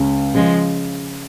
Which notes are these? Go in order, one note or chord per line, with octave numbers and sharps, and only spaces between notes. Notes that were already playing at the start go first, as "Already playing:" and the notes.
Already playing: C#2 C#3
C#3 F3 G#3